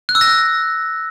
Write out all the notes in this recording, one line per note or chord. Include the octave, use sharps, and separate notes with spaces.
F#6
E6
A#6
F#6